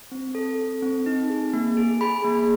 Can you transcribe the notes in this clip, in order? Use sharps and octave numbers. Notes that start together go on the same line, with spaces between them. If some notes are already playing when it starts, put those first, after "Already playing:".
C4
A4
A4
C4
D#4
G#4
A#3
G#4
G#4 B5
A#3